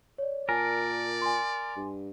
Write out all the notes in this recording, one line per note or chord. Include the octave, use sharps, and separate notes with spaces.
C#5 D5
A#2 A#4 D5 G#5 A5
G#5 C6
G2